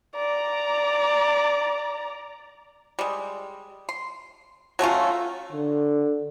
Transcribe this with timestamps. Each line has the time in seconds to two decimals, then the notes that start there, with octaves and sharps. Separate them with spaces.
0.16 D5 A#5
2.99 G3 G#3
3.89 C6
4.79 F#3 A3 C#4 F4
5.52 D3